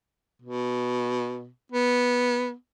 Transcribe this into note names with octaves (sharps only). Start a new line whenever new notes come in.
B2
B3